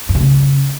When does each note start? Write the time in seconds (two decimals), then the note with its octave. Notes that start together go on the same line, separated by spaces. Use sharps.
0.09 G2
0.15 D3
0.21 C#3